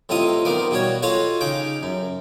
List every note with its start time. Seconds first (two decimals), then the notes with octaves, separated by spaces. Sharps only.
0.09 A2 C3 F4 D#5 D#6
0.45 D#3 F3 B3 D5
0.71 B2 G3 F#4 C#5
1.02 F4 F#4 A4 C#5 D#5 F5
1.41 C#3 D#4 G5 D6
1.83 F#2